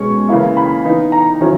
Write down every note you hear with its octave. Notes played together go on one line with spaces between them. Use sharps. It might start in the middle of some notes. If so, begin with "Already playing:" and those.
Already playing: B2 G#3 C#4 C#6
C#3 E3 A#3 E4
B5
E3 B3 D#4
A#5
D#3 F#3 C#4 E4